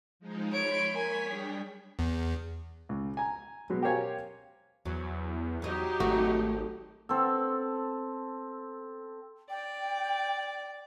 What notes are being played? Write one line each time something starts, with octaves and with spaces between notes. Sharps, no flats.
F3 G#3 D#4
C#5 B5 C6 D7
A#3 C#5 G#5 B6
G3 D4 G#4 G5
E2
C#2
G#5 A#5
B2 F#3 G#3
G4 A#4 C5 C#5 F5 G#5
E2 F#3
E2 F#3 D#4 G4 D#5
G#1 A3 F#4
C4 A4
D5 G5